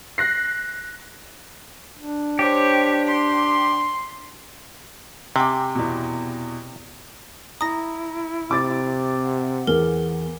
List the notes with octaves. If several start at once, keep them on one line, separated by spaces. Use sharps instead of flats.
F#6 A#6 C7
D4
G4 C5 C#5
C6
C3 G5 G#5 D6
E2 B2
E4 A#5 D#6 A#6
C3 D6 A6
F#5
E2 G#4 A#4